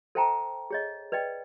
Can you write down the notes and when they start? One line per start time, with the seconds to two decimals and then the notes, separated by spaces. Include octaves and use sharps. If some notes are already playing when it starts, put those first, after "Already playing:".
0.15 A4 C5 E5 G5 A5 A#5
0.71 G#4 C#5 D#5
1.12 B4 D5 D#5 G5